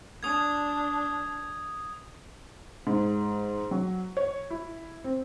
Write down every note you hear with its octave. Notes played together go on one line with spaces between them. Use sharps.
D4 D#6 G#6
G#2
F#3
C#5
E4
C4